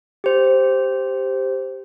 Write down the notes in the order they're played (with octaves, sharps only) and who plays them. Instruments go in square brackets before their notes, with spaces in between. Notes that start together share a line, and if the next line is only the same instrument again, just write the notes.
[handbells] G4 C5